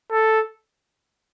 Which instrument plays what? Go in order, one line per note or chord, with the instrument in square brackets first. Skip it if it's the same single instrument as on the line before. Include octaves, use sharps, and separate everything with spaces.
[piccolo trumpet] A4